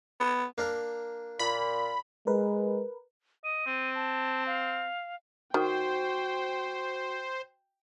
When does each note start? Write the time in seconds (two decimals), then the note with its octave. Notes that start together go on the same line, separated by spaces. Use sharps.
0.20 B3
0.58 A#3 D4 A#4
1.39 A#2 B5
2.27 G#3 A#4 B4
3.44 D#5 D#7
3.66 C4
3.95 A5
4.46 F5
5.54 D#3 F#4 C5 G5